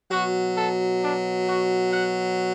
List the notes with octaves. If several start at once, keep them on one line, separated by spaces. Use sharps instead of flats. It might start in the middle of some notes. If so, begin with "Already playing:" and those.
B2 F#3 F#4
A4
D4
F#4
F#5